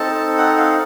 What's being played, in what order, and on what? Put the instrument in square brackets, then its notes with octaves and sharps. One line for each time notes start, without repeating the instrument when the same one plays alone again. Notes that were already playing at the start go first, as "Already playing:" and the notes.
Already playing: [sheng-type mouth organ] C4 D#4 A4 A5
F#5
F5